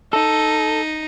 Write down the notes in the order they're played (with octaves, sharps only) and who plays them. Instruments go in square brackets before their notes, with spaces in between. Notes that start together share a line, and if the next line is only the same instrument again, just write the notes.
[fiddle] D#4 [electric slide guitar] A4